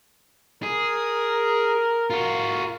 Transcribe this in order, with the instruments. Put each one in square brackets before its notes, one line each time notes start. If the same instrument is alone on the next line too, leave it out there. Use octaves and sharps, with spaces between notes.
[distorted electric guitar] G#4 [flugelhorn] A#4
[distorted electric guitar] F4 F#4